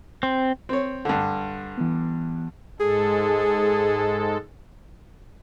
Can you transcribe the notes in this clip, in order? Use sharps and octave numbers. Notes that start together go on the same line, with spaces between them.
C4
C4 C#5
G2 D3
E3 B3
G#2 G#3 G#4 A4